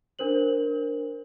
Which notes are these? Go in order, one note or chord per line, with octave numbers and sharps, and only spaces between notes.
D4 A#4 C5 F#7